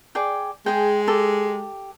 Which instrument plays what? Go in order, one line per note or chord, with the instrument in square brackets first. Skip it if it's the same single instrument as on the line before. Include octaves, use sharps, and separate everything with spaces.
[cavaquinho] G#4 D5 G5
[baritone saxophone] G#3 [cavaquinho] G#4 G5
[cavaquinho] G4 A4